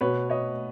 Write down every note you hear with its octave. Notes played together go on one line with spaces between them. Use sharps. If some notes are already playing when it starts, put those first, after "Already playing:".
B2 B4 C#5
C#5 D#5